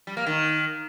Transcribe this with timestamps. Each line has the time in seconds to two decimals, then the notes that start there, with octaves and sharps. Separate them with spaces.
0.07 G3
0.17 A#3
0.26 D#3